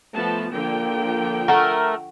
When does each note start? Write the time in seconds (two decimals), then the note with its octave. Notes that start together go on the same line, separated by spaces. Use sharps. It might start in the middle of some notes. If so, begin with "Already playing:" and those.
0.14 F3 A3 B3 A5
0.54 D3 F3 A#3 G5
1.48 A3 A#4 F#5 C#6